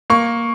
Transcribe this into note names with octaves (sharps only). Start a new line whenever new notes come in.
A#3 C#6